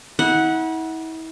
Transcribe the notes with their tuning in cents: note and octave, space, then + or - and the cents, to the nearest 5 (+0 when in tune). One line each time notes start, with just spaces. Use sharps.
E4 -40 F#5 +0